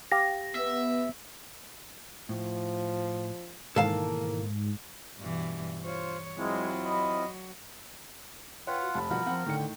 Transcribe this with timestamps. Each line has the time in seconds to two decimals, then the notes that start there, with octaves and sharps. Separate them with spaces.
0.12 G4 F5 A#6
0.55 B3 E5
2.29 A2 F3
3.76 G#2 B2 D#3 E3 A#3 A4 F5 A5
5.18 G2 B2 E3
5.85 F4 C5 C#5
6.38 F#3 G#3 C4 E4 F4
6.84 D#5 B5
8.67 F4 B4 C#5 F#5 G5
8.82 F#4
8.95 F1 A5 B5
9.10 C2 B2 F3 A#4 F#5
9.26 F3 C4 F#5
9.46 A2 D3 D#3 G5 C#7